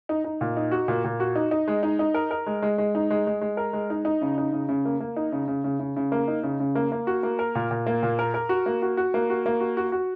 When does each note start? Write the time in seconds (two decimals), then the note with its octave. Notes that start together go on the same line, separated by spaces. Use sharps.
0.09 D#4
0.24 D#4
0.41 A#2
0.57 D#4
0.72 F#4
0.88 A#2
1.04 A#2
1.20 F#4
1.36 D#4
1.51 D#4
1.68 G#3
1.83 D#4
1.99 D#4
2.14 A#4
2.31 A#4
2.46 G#3
2.62 G#3
2.78 G#3
2.95 D#4
3.10 G#3
3.27 G#3
3.41 G#3
3.57 A#4
3.73 G#3
3.90 D#4
4.05 D#4
4.22 C#3
4.38 D#4
4.53 C#3
4.69 C#3
4.85 A#3
5.00 A#3
5.16 D#4
5.32 C#3
5.48 C#3
5.64 C#3
5.80 C#3
5.97 C#3
6.12 A#3
6.28 D#4
6.43 C#3
6.60 C#3
6.75 A#3
6.92 A#3
7.07 F#4
7.23 A#3
7.39 A#4
7.55 A#2
7.71 A#2
7.86 A#3
8.03 A#2
8.19 A#4
8.34 A#4
8.49 F#4
8.66 A#3
8.82 F#4
8.97 F#4
9.14 A#3
9.30 F#4
9.46 A#3
9.60 F#4
9.77 F#4
9.92 F#4